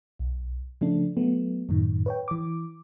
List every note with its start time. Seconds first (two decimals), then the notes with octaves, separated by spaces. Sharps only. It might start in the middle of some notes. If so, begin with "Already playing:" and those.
0.19 B1
0.81 C#3 F3 A3 D4
1.17 F#3 A3 B3
1.69 F#2 A2 D#3
2.06 B4 C#5 G5
2.28 E3 D6